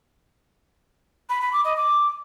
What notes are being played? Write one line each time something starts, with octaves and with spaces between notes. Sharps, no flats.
B5
B5
D6
D#5
D6